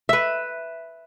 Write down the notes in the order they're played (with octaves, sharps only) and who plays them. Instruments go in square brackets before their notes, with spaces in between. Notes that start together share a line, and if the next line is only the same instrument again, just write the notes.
[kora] B4 E5